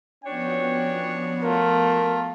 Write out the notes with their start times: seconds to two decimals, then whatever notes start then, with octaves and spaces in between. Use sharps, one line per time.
0.24 F3 B3 C#4 D4 F#4 C#5 G5
1.43 A3 F4 A#4